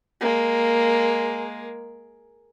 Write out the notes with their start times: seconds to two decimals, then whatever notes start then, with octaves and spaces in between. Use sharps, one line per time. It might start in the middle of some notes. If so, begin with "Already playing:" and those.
0.21 G#3 A#3